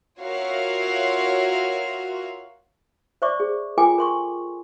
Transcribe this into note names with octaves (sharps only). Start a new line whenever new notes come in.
F4 F#4 A#4 C#5 E5 F5
C5 D5 E5 C#6 D6
G#4
F4 A4 A#4 G5 G#5 D6
A#4 C6 C#6